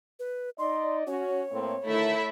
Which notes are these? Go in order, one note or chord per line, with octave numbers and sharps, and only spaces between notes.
B4
D#4 D5 D#5 C6
C#4 F#4 C#5
A2 A#3 C4
D3 D#3 A3 E4 E5